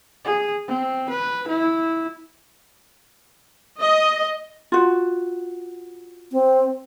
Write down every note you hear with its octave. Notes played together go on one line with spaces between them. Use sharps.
G#4
C4
B4
E4
D#5
F4 F#4
C4